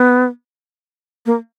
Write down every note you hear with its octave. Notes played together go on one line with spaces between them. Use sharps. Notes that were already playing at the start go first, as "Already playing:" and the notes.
Already playing: B3
A#3